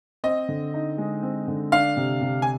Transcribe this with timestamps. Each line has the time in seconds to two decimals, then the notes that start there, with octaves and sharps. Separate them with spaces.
0.24 C4 D#5
0.49 D3
0.74 D#4
0.98 G#3
1.23 C4
1.48 D3
1.72 D4 F5
1.97 C3
2.21 C3
2.42 G#5